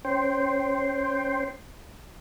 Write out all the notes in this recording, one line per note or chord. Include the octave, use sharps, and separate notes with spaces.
C#4 C5 G5 C6